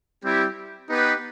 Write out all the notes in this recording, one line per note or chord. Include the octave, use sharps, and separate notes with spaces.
G3 C4 E4 G4
B3 D#4 G4 B4